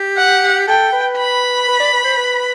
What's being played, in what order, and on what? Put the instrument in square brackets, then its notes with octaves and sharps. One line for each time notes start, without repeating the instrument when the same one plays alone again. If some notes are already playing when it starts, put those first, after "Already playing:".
Already playing: [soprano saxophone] G4
[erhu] F#5
[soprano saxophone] A4 [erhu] G5
[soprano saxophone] B4
[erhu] B5
[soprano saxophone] B4
D5
B4
C5
B4